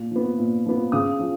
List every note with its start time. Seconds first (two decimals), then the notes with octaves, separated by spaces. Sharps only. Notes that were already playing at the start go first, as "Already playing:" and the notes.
Already playing: A#2
0.11 F3
0.16 B3
0.38 A#2
0.65 F3 B3
0.92 C#3 D#6
1.19 F3